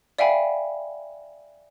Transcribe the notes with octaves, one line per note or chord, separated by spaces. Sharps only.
D5 E5 F5 G5 G#5 B5